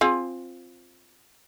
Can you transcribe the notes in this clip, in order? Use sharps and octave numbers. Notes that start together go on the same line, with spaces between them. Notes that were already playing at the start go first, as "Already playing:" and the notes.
C4 F4 G#4